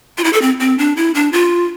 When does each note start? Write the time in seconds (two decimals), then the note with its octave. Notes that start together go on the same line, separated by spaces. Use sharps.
0.18 F4
0.24 E4
0.33 A4
0.42 C4
0.60 C4
0.78 D4
0.97 E4
1.15 D4
1.33 F4